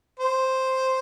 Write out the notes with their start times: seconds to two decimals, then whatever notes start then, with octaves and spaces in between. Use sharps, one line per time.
0.20 C5